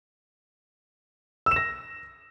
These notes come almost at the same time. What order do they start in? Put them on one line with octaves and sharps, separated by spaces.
E6 E7 A#6